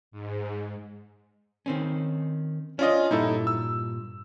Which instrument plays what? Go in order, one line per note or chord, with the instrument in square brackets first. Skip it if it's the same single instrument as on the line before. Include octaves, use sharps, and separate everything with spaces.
[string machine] G#2
[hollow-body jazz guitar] D#3 C4 C#4
[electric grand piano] C#4 F4 D#5 [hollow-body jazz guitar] D4
[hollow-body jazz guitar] G2 A#2 [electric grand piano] D#4 E4 A4
[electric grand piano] E6